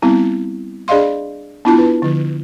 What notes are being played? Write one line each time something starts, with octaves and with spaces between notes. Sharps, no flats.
G3 B3 C4 E4
D4 G#4 D5 D#5 F5 C6
B3 D4 E4 F4 A5
B4
D3 F3